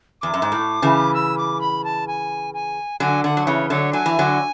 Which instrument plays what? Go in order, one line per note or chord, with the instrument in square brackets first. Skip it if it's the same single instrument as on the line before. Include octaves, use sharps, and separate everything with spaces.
[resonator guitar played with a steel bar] E2 [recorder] D6
[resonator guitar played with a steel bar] F#2
G#2
A2
C#3 E3
[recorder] E6
D6
B5
A5
G#5
G#5
[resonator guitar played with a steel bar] D3 F#3 [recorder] G#5
[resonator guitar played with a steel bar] D3 [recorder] F#5
[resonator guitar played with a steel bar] F#3
[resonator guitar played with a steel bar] C#3 E3 [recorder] C#5
[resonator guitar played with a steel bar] D3 F#3 [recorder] C#5
[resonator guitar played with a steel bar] F#3 [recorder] G#5
[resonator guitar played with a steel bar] E3
D3 F#3